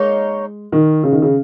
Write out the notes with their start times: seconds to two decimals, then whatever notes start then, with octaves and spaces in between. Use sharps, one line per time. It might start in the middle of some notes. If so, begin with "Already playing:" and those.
Already playing: G#3 A#3 D#4 C#5
0.72 D#3
1.03 C#3
1.12 D#3
1.22 C#3